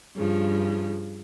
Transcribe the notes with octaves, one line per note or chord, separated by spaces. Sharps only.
G2 C#3 F3